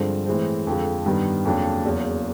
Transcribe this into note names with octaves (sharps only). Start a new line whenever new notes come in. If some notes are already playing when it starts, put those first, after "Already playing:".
Already playing: G2 D3 F3 G#3 C4
A2 E3 G#3 C4
F2 D3 F3 G#3
G2 D#3 G3 B3
F2 C#3 F#3 A#3 D4
E2 C#3 F#3 A#3